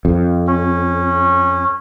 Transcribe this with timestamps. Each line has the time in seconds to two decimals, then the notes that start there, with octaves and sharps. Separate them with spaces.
0.05 F2
0.47 C#4